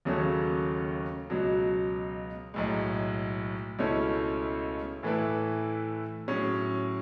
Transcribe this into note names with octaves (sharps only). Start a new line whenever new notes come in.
D#2 C#3 F#3 A3 C#4
C#2 B2 F#3
B1 A2 G#3
C#2 B2 A3 C#4 E4
A2 E3 A3 E4 B4
A2 F#3 C#4 G#4